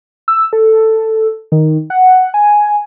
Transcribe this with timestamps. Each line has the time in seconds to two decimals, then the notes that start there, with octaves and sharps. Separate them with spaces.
0.28 E6
0.53 A4
1.52 D#3
1.90 F#5
2.34 G#5